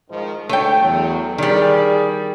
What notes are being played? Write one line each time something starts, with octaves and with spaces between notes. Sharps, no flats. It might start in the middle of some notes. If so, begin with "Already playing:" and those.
G#2 D#3 F3
D2 A3 C#5 G5
E2 F#3
D#3 G3 G#4 D5